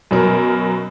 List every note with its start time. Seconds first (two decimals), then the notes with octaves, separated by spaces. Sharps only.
0.11 F#2 B2 A#4